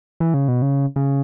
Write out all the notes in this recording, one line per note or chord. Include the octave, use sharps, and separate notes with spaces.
E3
C#3
B2
C#3
C#3